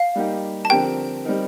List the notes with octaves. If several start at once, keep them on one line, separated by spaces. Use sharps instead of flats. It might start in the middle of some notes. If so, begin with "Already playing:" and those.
Already playing: F5
G3 A#3 D#4 G4
A5
D3 F3 C4 G4 A#4 G5
G3 C4 D#4 A#4